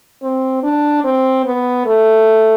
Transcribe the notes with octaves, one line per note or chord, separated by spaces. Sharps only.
C4
D4
C4
B3
A3